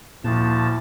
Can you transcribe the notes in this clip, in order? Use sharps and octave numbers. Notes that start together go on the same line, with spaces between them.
D2 A#2 F3 E4 A5